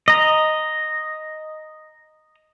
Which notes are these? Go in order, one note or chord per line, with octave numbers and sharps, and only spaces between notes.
D#5 A#5